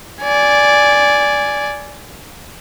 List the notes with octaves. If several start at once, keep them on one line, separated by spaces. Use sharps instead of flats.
D5 G#5